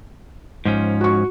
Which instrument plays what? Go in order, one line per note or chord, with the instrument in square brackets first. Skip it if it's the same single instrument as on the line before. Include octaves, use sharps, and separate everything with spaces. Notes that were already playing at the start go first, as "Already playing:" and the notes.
[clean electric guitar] G#2 F3 C#4
[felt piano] F#4 C#6